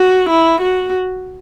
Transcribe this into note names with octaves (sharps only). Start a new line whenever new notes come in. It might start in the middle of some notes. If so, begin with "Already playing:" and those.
Already playing: F#4
E4
F#4